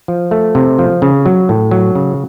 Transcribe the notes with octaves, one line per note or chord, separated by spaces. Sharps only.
F3
A3
C3
F3
C#3
F#3
A2
F#3
C#3